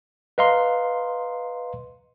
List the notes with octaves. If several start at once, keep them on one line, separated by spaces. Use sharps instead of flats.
B4 D#5 F5 A#5 C6